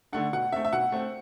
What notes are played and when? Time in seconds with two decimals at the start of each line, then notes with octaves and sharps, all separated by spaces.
0.13 D3 A3 D4 F#5
0.33 B2 F#5
0.52 A3 C4 E5
0.65 E5
0.73 B2 F#5
0.92 A3 C4